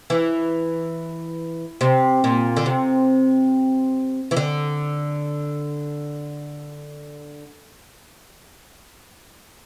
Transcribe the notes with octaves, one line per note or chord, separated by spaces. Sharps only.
E3
C3
A#2
D3
C3
E3
D3